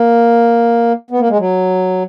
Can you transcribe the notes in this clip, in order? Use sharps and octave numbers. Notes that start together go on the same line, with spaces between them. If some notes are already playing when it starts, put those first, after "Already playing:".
Already playing: A#3
B3
A#3
G#3
F#3